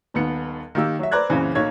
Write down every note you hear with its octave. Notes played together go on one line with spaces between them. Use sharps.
D#1 D#2 B3 C#7
D#3 A#3 G4 E6
F#3 E5
B4 C5 D5 A#5 F#6 G#6
F#2 A#2 C#3 E3 C4
B1 A#3 C#5 G#6